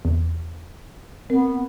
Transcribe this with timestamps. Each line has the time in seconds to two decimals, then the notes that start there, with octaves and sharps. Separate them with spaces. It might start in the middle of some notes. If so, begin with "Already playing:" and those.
0.05 E2
1.30 B3 C4 A#4